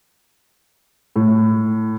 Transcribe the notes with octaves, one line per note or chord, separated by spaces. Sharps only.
A2